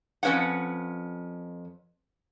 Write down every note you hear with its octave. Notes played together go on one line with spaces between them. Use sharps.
F2 C#4 B4 C#5 F#5